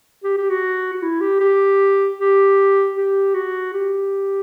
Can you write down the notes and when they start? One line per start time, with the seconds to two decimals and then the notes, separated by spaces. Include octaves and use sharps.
0.24 G4
0.37 G4
0.50 F#4
0.93 F#4
1.02 E4
1.21 G4
1.40 G4
2.18 G4
2.96 G4
3.34 F#4
3.73 G4